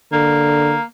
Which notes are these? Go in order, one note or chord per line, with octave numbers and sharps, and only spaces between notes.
D3 A#3